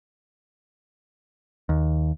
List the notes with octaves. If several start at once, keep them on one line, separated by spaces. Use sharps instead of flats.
D#2